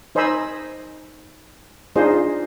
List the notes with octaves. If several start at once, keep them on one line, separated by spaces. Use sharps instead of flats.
D#4 C5 D#5 G#5 B5 E6
D4 D#4 F4 G#4 C5 D#5